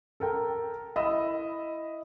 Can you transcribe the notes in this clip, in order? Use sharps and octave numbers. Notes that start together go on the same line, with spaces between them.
A4 A#4 G5
E4 D#5 E5 B5 E6